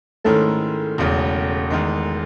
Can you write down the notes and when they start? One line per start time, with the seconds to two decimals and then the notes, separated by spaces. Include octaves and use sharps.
0.24 G#2 D#3 G#3 A3 C#4 E4 A4
0.98 E1 E2 C#3
1.70 E2 D#3 G#3